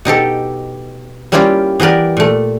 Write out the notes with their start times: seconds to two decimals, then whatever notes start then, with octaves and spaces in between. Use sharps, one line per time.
0.05 B2 D#4 G4 A4
1.32 G3 A#3 C#4 E4 F4 G4
1.80 E3 B3 G4 A#4 D5
2.17 A#2 A3